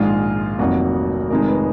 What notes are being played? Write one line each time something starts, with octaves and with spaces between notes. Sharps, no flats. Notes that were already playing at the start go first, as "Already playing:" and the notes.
Already playing: A#1 G#2 D#3 G#3 F4
F1 F2 D#3 F#3 A#3 F#4
F1 F2 D#3 G#3 A#4
B4